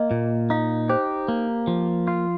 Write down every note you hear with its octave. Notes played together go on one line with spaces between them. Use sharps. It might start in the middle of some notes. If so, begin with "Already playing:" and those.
Already playing: A#3 D#5
A#2
D#4 F5
G4 C5
A#3
F3
F4